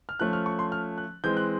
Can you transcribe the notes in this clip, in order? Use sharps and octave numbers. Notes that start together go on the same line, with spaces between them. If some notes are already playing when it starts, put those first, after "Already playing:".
F6
F3 A3 C#4 F#6
F6
C#6
C6
F6
F#6
E3 G#3 C4 G6
F#6